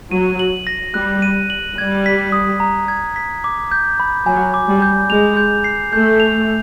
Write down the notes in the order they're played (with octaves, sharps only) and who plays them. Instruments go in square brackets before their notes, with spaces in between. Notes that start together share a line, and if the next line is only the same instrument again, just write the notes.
[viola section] F#3 [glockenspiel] D#7
[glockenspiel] F#7
A#6
[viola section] G3 [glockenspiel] F#6
[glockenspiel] D#7
F#7
[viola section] G3 [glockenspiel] G#6
[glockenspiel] B6
D#6
A#5
G#6
B6
D6
G6
B5
[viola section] F#3 [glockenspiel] G#5
[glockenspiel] D6
[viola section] G3
[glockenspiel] G6
[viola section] G#3 [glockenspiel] F7
[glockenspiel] G6
C7
[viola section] A3 [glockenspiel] G6
[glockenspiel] F7